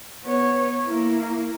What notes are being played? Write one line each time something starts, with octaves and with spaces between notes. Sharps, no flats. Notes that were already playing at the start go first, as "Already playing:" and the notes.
B3 C#5
A#3 E4